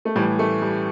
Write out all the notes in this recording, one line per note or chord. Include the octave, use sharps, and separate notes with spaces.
A3
A2 E3 G3
A3
G3